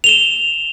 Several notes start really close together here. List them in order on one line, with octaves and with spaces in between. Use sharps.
F7 G7 E7